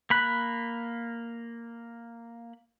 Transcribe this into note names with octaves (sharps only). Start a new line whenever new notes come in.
A#3 B5 F#6